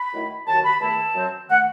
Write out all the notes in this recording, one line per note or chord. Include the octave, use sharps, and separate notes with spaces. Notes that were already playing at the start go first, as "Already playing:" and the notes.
Already playing: B5
F#2 D#3 A3 E4
D#2 D#3 F#3 A5
B5
E2 D#3 A3 E4 A5
F#2 F#3 C4
D#3 A3 F#5